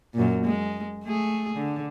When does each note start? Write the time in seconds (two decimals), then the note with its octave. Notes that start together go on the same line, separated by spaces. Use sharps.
0.14 F#2 A#2
0.45 G#3
1.04 A3 G#4
1.56 D3